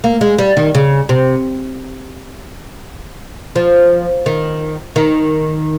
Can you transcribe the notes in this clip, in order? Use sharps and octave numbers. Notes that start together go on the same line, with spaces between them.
A#3
G#3
G3
D#3
C#3
C3
F3
D#3
D#3